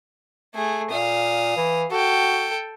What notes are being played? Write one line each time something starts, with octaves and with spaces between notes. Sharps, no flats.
A3 G#4
A#2 F5 D#6
E3
F#4 A4 G5